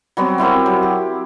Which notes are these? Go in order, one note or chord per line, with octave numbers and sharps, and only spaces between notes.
F#3 G3 B3 C4
C4 E4 G4 A#4
F#3
G4